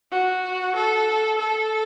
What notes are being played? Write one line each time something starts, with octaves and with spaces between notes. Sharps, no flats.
F#4
A4
A4